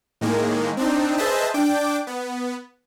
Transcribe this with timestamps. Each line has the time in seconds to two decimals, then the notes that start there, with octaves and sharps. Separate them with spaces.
0.21 A2 D#3 G#3 A#3
0.77 C4 D4 D#4
1.17 G#4 B4 C5 D#5 E5 A5
1.54 D4 G5 D6
2.07 B3